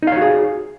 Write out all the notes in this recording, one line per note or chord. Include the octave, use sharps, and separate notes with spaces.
D#4 F#4 G#4 C#5 F5